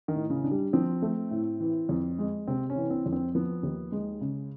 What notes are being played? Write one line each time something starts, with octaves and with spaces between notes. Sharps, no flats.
D#3
A2
C#3
D4
G3
F3 C4
A3
A2
E3
F2
G#3
C3 C4
C#4
E3
C4
F2
C4
F3 B3
D#2
G#3
C#3